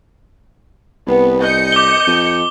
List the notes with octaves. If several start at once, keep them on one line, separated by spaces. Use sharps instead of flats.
C2 B3
D#5 G6 C#7
D6 G7
F2